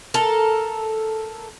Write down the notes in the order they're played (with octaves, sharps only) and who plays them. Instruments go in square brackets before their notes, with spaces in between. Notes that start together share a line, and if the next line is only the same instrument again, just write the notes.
[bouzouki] A4 A#4